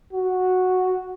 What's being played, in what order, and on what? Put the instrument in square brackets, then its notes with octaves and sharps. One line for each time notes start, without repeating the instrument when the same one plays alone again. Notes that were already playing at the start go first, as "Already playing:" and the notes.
[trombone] F#4